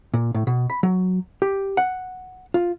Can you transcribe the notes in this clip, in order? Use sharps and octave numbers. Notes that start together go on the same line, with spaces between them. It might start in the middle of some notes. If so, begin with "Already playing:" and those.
A#2
A2
B2
B5
F#3
G4
F#5
F4